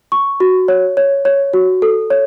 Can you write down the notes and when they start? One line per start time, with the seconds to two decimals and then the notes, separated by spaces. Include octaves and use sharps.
0.12 C#6
0.40 F#4
0.68 C#5
0.97 C#5
1.25 C#5
1.53 F#4
1.82 A4
2.10 C#5